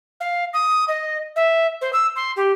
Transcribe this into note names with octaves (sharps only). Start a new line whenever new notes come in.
F5
D#6
D#5
E5
C5
E6
C6
G4